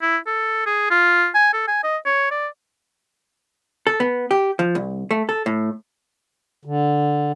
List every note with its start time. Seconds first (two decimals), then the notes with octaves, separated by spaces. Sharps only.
0.02 E4
0.27 A4
0.66 G#4
0.91 F4
1.35 G#5
1.53 A4
1.68 G#5
1.84 D#5
2.05 C#5
2.31 D5
3.87 A4
4.00 B3
4.31 G4
4.59 F3
4.75 C2
5.11 A3
5.29 A4
5.46 A2
6.65 D3